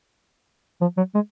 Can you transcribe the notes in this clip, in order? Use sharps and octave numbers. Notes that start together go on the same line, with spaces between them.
F3
F#3
G#3